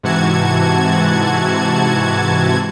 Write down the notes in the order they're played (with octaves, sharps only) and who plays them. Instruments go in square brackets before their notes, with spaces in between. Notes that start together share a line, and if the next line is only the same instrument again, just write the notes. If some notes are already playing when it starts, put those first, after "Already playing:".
[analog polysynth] G#2 C3 E3 F#4 A5 G#6